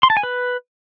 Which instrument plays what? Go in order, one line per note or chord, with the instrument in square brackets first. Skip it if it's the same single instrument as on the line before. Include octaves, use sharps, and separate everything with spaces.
[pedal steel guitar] C6
A5
G#5
B4